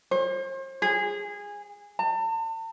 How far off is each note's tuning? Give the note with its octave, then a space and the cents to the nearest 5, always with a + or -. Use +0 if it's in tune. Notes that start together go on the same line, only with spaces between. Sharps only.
C5 +40
G#4 -20
A5 +40